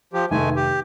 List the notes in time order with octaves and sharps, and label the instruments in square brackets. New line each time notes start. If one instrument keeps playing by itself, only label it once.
[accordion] F3 G4
[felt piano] F1 D#3 [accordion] G#3 A3 G#5
[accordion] G4